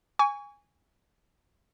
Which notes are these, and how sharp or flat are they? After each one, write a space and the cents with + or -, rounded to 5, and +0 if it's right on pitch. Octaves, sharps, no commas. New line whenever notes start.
G#5 -15 C#6 +30